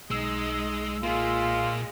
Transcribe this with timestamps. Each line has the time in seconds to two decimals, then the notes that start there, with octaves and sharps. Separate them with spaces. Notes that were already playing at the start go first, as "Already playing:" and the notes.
0.11 B1 G#3 D#4 D#5 E6
1.03 A#2 G#3 A#3 F4